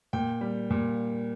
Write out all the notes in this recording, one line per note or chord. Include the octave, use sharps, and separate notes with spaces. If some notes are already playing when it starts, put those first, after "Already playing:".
A#2 G5
G3
A#2